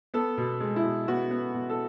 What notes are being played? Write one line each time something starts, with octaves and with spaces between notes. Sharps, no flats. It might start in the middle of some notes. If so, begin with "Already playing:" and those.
B3 A4
B2
G#3
E4
B2
B3 F#4
B3
B2
A4